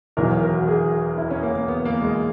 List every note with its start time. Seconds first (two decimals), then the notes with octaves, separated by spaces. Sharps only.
0.17 E1 E2 D#3 F#3 A#4
0.43 A#4
0.56 F#4
0.68 G#4
1.18 E4
1.31 C#4
1.43 A#3
1.56 A#3
1.68 B3
1.85 A#3
2.01 G#3